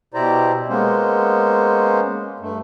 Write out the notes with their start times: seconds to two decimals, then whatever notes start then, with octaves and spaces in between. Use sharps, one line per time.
0.14 B2 E4 G4 C5 D5 A#5
0.68 G#3 A#3 B3 C#4 C5
2.40 G2 A3